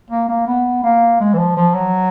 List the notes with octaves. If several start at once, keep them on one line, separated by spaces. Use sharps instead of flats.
A#3
A#3
B3
A#3
G#3
E3
F3
F3
F#3